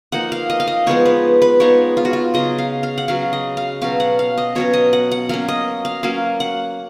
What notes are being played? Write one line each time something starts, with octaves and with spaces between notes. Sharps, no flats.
F3 A#3 D#4 F#5
F5
D#5
F5
D#5
F3 G#3 B3 D#4 C#5
B4
B4
F3 G#3 B3 D#4 C#5
F4
F#4
F4
C#3 F#3 C#4 D#5
F5
F5
F#5
C#3 F#3 C#4 F5
D#5
F5
B2 F#3 C#4 F5
F#5
F5
D#5
B2 F#3 C#4 C#5
D#5
F#5
F#5
F#3 A#3 C#4 F5
D#5
F5
F#3 A#3 C#4 F5
F#5